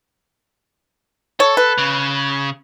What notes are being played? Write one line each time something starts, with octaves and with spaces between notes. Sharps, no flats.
A4 C#5
B4
C#3